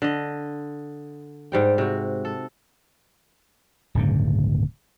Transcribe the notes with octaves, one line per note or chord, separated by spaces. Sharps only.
D3 D#5
G#2 G3 G5
C3 F#4
A4
D1 G2 C#3